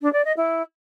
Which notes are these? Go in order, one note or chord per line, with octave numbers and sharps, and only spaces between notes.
D4
D5
D#5
E4